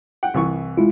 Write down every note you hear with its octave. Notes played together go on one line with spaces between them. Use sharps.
F#5 G5
C2 E3 C#6
G#3 E4 F4